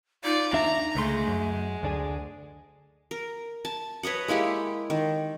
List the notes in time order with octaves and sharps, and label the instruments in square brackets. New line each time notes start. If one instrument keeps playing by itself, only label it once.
[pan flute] D#4 [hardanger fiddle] F4 D5
[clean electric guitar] D#2 D4 E5 [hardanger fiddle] A#5
[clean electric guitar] C#2 D3 C6 [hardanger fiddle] G#3 [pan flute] A3
[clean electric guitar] F#2
D2 D4 G#4
[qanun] A#4
A5
B4 C#5 D#5 F#5
G#3 A#3 E4 G4
D#3